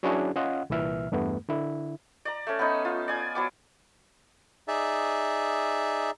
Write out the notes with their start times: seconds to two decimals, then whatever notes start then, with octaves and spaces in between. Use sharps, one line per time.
0.03 F#3 C#4 D4 E4 F#4 G#4
0.36 C#4 F4 D#5 F5 F#5
0.70 C2 A#2 E3 E5 F6
1.12 E2 G2 A3 B3
1.49 D3 E4
2.25 D5 A#5
2.47 A3 C#4
2.59 B3 C#4 D#4
2.85 F4
3.08 D5 G#5
3.35 F#3 B3 D6
4.68 D#4 G#4 D5 E5